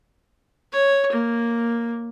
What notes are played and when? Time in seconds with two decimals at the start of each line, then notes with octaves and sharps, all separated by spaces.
0.72 C#5
1.12 A#3